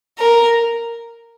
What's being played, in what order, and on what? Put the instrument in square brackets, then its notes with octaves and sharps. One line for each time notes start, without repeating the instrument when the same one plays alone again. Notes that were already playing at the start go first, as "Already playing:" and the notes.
[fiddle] A#4